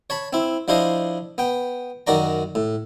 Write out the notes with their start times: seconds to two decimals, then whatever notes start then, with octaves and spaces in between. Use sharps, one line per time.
0.10 C#5 A5 B5
0.33 C4 E4
0.68 F3 D4 E4 F4 C5 D#5
1.38 B3 G5
2.07 F#2 D#3 F#4 D5 A#5
2.55 A2